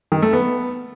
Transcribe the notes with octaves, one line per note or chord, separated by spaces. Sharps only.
D#3
A3
B3